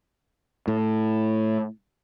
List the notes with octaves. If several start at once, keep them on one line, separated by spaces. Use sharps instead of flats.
A2